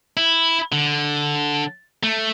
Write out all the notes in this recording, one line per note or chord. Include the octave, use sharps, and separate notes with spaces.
E4
D3
A3